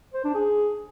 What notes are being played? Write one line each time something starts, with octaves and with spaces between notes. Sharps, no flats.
C5
D4
G#4